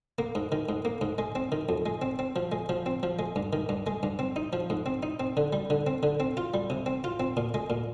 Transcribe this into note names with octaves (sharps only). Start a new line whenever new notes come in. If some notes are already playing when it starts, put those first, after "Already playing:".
A#3
G#2
D#3
G#2
A#3
G#2
G#3
C4
D#3
F2
G#3
C4
C4
F3
G#3
F3
C4
F3
G#3
G2
D#3
G2
G#3
G2
C4
D#4
F3
G#2
C4
D#4
C4
D3
G3
D3
C4
D3
C4
F4
G3
C3
C4
F4
C4
A#2
G#3
A#2